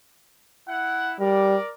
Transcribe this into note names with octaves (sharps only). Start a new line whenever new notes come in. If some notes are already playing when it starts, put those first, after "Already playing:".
E4 F#5
G3 A#4 D5